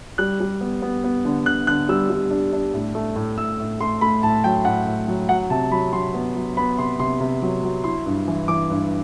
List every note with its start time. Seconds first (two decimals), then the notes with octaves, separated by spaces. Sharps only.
0.18 G3 F#6
0.40 G3
0.61 B3
0.82 B3
1.04 B3
1.25 D3
1.46 D3 F#6
1.67 D3 F#6
1.89 G3 E6
2.10 G3
2.31 D4
2.53 D4
2.74 A2
2.95 A3
3.16 A2
3.37 A2 E6
3.60 A2
3.80 A3 C6
4.01 A3 B5
4.23 A2 A5
4.44 F#3 G5
4.65 A2 F#5
4.86 A2
5.08 F#3
5.29 F#3 F#5
5.50 C3 A5
5.71 F#3 B5
5.93 F#3 C6
6.14 B3
6.36 F#3
6.57 B3 B5
6.79 C3 C6
7.00 C3 C6
7.21 C3
7.42 F#3
7.63 F#3
7.84 E4 C6
8.06 G2
8.28 E3
8.48 E3 D6
8.70 G2